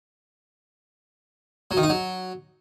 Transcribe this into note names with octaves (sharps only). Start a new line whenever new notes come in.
F#3
D#3
D#4
F#3